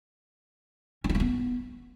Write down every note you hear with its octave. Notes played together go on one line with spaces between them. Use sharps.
C#4
D#4
A#3
B3